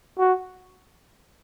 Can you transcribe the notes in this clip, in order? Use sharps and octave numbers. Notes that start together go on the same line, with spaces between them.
F#4